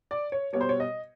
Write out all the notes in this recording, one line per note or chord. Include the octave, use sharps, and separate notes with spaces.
D5
C#5
B2 G3 C#5
C5
C#5
D#5